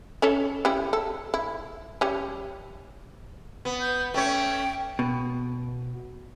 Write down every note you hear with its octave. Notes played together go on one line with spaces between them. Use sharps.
C#4 A4 C#5
G3 C#4 E4
A4
E4
G3 C#4
B3
G6
A3 C#4 C#5 G5
B2